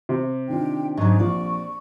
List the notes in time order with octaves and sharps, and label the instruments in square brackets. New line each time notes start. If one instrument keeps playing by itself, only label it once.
[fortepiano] C3
[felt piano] D#3 D4 F4 [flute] G5
[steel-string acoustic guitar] G#2 C#3 F#3 [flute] C#6
[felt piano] A#1 F4 [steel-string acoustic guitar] D5